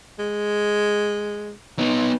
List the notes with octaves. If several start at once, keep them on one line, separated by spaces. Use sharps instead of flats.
G#3
B3 D#4